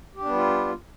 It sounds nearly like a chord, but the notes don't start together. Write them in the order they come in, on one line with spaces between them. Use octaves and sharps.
G4 D4 B3 G3 F4